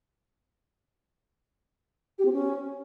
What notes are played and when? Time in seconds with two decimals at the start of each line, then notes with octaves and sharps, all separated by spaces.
2.19 G4
2.25 C4
2.32 C#4